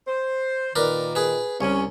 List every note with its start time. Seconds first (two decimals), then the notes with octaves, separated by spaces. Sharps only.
0.08 C5
0.76 A#2 D#3 A#4 B4 D5
1.15 G#4 B4
1.61 C2 C#4